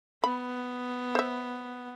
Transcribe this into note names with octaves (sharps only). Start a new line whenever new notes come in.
B3 B5
C5 E5